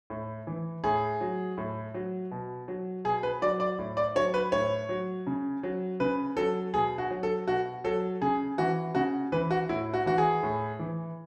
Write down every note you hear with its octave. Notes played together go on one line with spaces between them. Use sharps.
A2
E3
A2 G#4
F#3
A2
F#3
B2
F#3
B2 G#4
B4
F#3 D5
D5
A2
D5
F#3 C#5
B4
A2 C#5
F#3
C#3
F#3
C#3 B4
F#3 A4
B2 G#4
F#4
F#3
A4
B2 F#4
F#3 A4
C#3 G#4
E3 F#4
C#3 F#4
E3 B4
F#4
A2 E4
F#4
E3 F#4
G#4
A2
E3